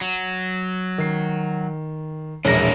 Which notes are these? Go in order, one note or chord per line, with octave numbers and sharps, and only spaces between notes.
F#3
D#3 C7
E1 A#1 E3 A#3 A#4 C#5 A#6